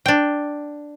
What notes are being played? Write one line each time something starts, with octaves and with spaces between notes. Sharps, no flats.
D4 G5